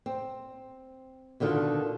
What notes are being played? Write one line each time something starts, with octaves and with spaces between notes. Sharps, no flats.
C4
B2 D3 D#3 F4